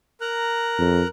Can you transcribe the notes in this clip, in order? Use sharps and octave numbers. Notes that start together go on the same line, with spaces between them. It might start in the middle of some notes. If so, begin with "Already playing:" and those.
A#4 A#5 F#6
F2